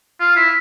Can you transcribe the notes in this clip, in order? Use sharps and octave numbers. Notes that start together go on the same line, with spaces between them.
F4
E4